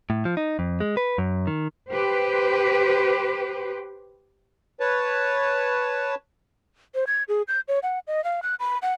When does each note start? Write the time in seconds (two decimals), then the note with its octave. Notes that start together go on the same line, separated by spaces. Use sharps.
0.10 A2
0.25 F3
0.37 D#4
0.59 F2
0.80 G#3
0.97 B4
1.18 F#2
1.47 D#3
1.90 G4 B4 C5
4.80 B4 C#5 A5
6.95 C5
7.07 G#6
7.28 G#4
7.48 G6
7.68 C#5
7.83 F#5
8.07 D#5
8.24 F5
8.43 F#6
8.60 B5
8.82 F#5